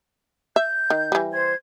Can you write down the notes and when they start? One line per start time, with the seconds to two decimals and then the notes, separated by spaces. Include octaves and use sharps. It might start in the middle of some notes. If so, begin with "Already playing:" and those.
0.56 E5 G6
0.90 D#3
1.12 E3 G3
1.31 C5 G#6